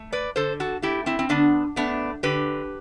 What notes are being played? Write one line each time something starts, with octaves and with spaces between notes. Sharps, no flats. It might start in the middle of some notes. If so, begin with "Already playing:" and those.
Already playing: A3
B4 D5
D3 A4 C5
F#4 A4
A3 E4 G4
C4 E4
C4
D3 B3 D4
A3 B3 D4
D3 G4 B4